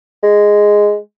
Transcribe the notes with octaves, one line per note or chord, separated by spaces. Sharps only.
G#3